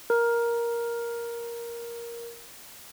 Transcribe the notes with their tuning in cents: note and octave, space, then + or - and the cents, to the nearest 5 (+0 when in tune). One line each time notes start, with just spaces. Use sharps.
A#4 +10